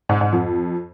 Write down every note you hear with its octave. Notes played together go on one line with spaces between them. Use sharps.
G#2
G#2
F2